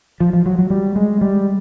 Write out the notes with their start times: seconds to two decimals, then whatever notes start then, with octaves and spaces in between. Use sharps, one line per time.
0.20 F3
0.33 F3
0.46 F#3
0.59 F#3
0.70 G3
0.96 G#3
1.21 G3